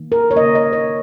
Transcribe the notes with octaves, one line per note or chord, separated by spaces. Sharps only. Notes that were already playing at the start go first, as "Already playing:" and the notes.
Already playing: D#3 A#3
A#4
C#5
C#3 A#3 D#5
D#5
C#5